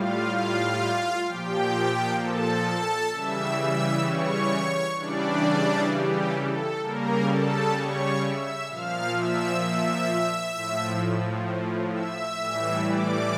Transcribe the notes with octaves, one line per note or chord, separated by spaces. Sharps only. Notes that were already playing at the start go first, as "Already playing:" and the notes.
Already playing: A2 G3 F4 F5
F4 F5
A#2 F3 G4 G5
A4 A5
A4 A5
C#3 E3 G3 E5 E6
E5 E6
C#5 C#6
C#3 E3 G3 D4 D5
G4
A4
C#3 G3 A#3 A#4
A4 A5
C#5 C#6
E5 E6
A#2 F3 F5 F6
E5 E6
E5 E6
A2 F3
E5 E6
A2 E3 G3
D5 D6